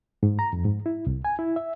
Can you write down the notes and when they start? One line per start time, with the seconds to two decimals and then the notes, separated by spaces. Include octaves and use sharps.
0.23 G#2
0.39 A#5
0.53 F2
0.66 G#2
0.86 E4
1.06 C2
1.25 G#5
1.39 E4
1.56 E5